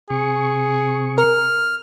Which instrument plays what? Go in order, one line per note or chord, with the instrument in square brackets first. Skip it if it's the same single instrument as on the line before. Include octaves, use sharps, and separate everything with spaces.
[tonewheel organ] C3 C#6 [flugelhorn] G#4
[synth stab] A#4 [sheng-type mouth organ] F6